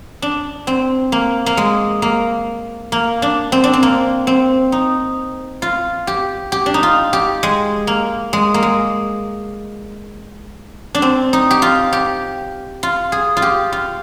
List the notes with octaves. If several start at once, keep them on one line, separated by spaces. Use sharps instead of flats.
D4
C4
A#3
A#3
G#3
A#3
A#3
D4
C4
D4
C4
A#3
C4
D#4
F4
G4
G4
D4
D#4
F4
G4
G#3
A#3
G#3
A#3
G#3
D4
C4
D#4
G4
F4
G4
F4
G#4
F4
G4
F4